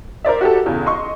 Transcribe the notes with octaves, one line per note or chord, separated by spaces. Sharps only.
A#4 C5 D5 E5
F#4 G4 A4
E2 C#3
D#5 C6 C#6